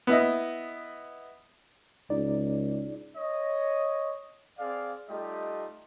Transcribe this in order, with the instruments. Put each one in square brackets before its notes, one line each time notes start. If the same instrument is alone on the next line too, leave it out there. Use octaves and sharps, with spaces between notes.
[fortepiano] B3 E4 D#5
[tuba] C#2 [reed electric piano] D#4 D5
[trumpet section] C#5 D#5
C4 G#4 D5 F5
G3 A3 D#4 F4 G4 D#5